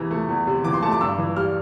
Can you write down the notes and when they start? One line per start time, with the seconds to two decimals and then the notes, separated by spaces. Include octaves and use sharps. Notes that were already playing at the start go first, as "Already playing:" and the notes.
Already playing: E2 C3 E3 A#5
0.11 A3
0.29 E2
0.47 C3
0.64 E3 D6
0.73 C6
0.82 A3 A5
0.92 D6
1.01 G2 E6
1.18 E3
1.36 G3 F6